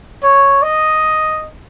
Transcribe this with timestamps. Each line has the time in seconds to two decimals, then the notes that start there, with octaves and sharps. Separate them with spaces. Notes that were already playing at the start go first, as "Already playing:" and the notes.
0.23 C#5
0.63 D#5